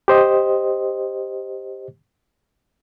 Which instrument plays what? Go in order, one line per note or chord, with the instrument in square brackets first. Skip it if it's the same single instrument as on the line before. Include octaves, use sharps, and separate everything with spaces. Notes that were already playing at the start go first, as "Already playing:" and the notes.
[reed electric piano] G4 C5 D#5